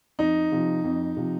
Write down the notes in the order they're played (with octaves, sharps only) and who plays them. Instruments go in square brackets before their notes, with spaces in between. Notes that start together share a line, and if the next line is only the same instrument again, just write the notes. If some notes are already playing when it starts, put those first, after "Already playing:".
[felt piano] F2 [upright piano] D#4
[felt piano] C3 F3
F2
C3 F3